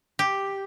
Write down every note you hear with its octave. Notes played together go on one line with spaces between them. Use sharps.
G4